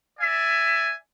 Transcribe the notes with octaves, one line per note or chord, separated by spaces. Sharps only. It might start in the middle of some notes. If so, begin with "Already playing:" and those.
D5 E5 G#5